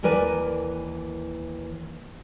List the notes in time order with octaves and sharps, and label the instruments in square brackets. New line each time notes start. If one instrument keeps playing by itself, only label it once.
[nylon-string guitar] D#2 E3 A#4 B4 D5 G#5